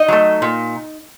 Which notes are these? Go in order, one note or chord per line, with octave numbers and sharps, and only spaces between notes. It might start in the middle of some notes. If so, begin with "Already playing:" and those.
Already playing: D#4 D#5
F#3 A3
A#2